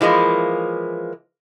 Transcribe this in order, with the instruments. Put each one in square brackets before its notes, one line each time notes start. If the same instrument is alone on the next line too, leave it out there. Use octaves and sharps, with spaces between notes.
[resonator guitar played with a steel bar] E3 F3 G#3 A#3